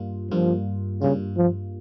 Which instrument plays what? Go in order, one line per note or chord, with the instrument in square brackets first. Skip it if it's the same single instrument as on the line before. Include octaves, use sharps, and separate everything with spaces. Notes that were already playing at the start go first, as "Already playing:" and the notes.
Already playing: [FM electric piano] G2 G3 A#3 F4
[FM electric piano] G2 G3 A#3 F4 [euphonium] F3
[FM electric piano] G2 G3 A#3 F4 [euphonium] C#3
[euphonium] F3